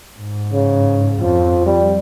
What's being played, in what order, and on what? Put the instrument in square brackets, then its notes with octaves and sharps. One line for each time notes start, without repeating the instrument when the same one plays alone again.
[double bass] G#2
[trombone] C#3
[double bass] F2 [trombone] F3
[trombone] G3